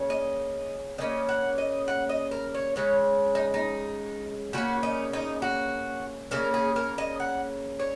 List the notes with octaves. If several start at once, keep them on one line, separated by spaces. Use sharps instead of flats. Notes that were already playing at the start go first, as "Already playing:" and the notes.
Already playing: C#3 A#3 C#4
D#5
C#3 A#3 C#4 D#5
F#5
D#5
F#5
D#5
A#4
C#5
C#3 G#3 C#4 C#5
D#4
D#4
C#3 A#3 C#4 F#4
D#4
D#4
F#4
C#3 A#3 C#4 A#4
G#4
A#4
D#5
F#5
C#5